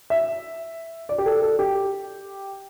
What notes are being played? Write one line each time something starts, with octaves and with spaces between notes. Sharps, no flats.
E5
D5
G4
A4
A4
G4